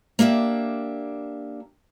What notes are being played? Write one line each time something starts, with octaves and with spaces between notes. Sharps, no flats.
A#3 D4 G4 E5